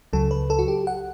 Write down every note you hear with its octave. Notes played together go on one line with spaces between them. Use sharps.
C#2 C#3 F#3 A4
B4
A4
F#4
G4
F#5